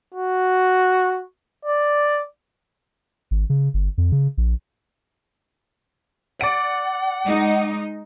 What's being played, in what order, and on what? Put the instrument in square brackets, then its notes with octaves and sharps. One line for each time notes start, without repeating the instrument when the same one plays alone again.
[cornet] F#4
D5
[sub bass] G#1
C#3
G1
F2
C#3
A#1
[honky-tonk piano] D5 D7 [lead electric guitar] F#5
[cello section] G#3 D#4